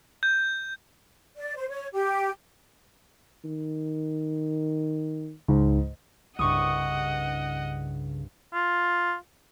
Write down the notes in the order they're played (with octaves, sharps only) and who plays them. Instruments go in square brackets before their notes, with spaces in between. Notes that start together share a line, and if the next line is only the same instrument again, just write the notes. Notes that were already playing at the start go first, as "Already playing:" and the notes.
[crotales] G6
[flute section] D5
C5
C#5
G4
[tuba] D#3
[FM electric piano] C#2 [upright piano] G#2
[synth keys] C2 G2 [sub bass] C#3 [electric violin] D#5 F#5 [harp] C#6 D#6
[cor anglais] F4